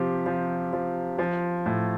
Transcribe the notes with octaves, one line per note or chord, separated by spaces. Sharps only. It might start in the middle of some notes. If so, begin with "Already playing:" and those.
Already playing: C3 F3 G4
F3
F3
F3
A2